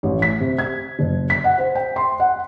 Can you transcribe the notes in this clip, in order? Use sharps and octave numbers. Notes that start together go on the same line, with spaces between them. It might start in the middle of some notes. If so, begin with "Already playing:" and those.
A1
B6
C3
G#6
F#1
B6
F#5
C5
G5
C6
F#5